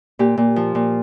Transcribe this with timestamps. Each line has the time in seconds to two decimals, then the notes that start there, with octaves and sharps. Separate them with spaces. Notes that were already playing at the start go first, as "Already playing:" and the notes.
0.19 A#2 G4
0.38 A#2
0.56 F3
0.75 A#2